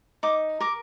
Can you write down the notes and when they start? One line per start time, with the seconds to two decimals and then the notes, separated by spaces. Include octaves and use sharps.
0.23 D#4 D6
0.60 A#4 D6